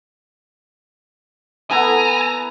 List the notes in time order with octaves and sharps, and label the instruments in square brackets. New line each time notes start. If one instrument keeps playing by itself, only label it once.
[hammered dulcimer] B3 E4 A4 [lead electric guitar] G#5 [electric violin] A#5